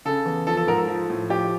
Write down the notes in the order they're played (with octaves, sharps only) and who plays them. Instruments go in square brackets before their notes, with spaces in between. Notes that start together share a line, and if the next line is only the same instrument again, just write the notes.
[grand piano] C#3 A4
E2
F3 A4
A4
G#2 A#4
A4
F3
A2
F3 G4